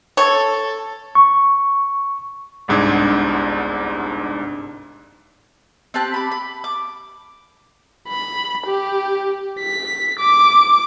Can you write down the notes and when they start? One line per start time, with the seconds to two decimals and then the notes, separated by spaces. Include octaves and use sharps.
0.17 A4 C#5
1.15 C#6
2.68 G1 C2 G#2 D4 G#6
5.94 C4 G4 A5 F#6
6.14 B5 D6
6.31 B5
6.64 D6
8.09 B5
8.66 G4
9.60 B6
10.19 D6